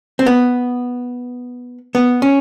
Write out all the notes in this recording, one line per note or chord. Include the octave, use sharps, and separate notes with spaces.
C4
B3
B3
C#4